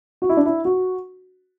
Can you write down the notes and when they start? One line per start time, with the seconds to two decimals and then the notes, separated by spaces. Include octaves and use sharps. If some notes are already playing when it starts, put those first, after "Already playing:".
0.22 F#4
0.29 E4
0.37 D4
0.46 E4
0.65 F#4